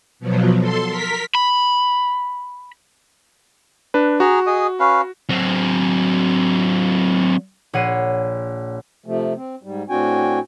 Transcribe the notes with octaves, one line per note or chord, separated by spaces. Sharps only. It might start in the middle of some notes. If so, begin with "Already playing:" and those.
B2 F3 F#3
A4 C6
A#4 B6
B5
D4 B4
F#4 G#4 A#5
G#4 D#5
C#4 B4 F5
F#3 C4
A#1 C#5 F#5 C7 D#7
C3 F3 A3
C4
G#2 G3
A2 C4 D4 F#4 G5 G#5